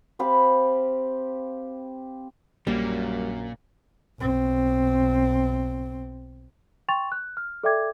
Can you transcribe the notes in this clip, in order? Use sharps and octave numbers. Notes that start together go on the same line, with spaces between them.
C4 G4 F5 B5
A#1 F#2 A#2 G3 A#3
B1 C4
G5 C6 C#6 A6 F7
F#6
F6
A4 D5 E5 G5 D6 G#6